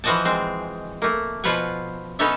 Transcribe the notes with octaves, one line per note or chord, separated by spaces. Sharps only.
E3 F3 F#4 D#5 G#5 A5
G#3 C4
A3 A#3
B2 F3 F4 B4 F#5 G#5
B3 C#4 D#4 A4 C#5 E5